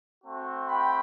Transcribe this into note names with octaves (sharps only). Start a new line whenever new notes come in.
A3 C4 F#4
G5 B5